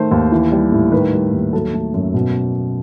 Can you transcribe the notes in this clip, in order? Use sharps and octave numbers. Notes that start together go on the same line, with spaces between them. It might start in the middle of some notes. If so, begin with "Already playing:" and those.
Already playing: D#3 A3 C5
D#2
E3
G3
A2
D#3 B4
G3
D#2
F#3 A4
A3
F#2
B2